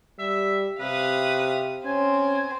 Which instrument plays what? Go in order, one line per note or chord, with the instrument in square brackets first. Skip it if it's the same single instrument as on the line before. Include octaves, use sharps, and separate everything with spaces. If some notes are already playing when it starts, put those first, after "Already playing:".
[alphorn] G3 [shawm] E5
[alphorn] C3 [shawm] B4 [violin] F5 D#6
[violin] C4 C5 [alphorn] C#4 [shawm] G#5